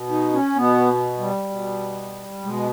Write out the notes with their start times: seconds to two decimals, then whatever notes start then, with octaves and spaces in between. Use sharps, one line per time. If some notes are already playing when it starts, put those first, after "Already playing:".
Already playing: B2
0.10 D#4
0.33 C#4
0.56 B2 B3
1.19 G3
1.49 B2
2.43 B2 G#3